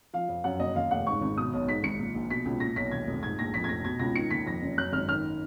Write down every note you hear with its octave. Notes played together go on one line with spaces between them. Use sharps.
F3 F5
F2
F#2 F#5
F#1 D#5
D#2 F5
F1 F#5
G#2 C#6
G#1
B2 D#6
B1
G#2 B6
G#1 C#7
A#2
A#1
B2 B6
C#2
A#2 A#6
B1 B6
D#2 G#6
F1
G#2 G#6
A#1 A#6
F2 B6
G#6
F1 A#6
B2 G#6
C#2 A#6
D#3 C#7
D#2 B6
F2 A#6
F#1
F#2 F#6
G#1 F6
D#3 F6